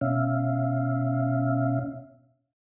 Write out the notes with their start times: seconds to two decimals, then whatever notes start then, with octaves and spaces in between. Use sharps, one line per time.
0.01 B2 C#4 E5 F5